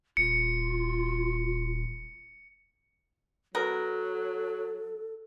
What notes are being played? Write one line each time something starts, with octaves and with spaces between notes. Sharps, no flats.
D#1 F4 C#7
F#3 B3 A4 A#4